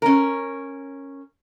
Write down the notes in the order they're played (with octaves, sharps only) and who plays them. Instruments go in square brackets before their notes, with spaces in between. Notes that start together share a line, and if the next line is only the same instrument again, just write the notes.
[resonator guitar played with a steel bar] C#4 A#4